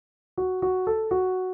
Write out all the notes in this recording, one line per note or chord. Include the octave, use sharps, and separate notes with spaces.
F#4
F#4
A4
F#4